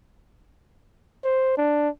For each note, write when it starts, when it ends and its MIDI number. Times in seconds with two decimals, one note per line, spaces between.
1.24 1.54 72
1.58 1.89 62